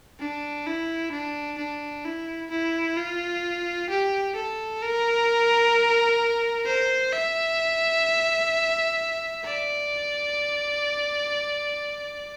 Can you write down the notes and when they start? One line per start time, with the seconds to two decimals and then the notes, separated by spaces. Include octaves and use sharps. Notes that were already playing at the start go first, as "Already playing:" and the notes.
0.20 D4
0.67 E4
1.12 D4
1.58 D4
2.05 E4
2.51 E4
2.97 F4
3.90 G4
4.36 A4
4.82 A#4
6.66 C5
7.13 E5
9.44 D5